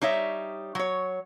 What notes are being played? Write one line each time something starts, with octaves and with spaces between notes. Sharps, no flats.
G3 D#4 C#5 E5
F#3 C#5